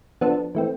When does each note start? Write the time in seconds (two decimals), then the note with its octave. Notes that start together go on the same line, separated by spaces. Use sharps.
0.21 F3 B3 D4 A4
0.55 E3 A3 C4